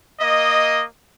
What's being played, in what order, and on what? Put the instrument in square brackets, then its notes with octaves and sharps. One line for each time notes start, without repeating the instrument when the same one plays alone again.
[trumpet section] A#3 D#5